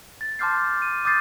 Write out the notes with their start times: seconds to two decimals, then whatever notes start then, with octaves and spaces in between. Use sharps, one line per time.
0.21 A6
0.39 A5 C6 D6 F6 G6 C7
0.82 D#7
1.05 D6 D#6 G6 A6 C7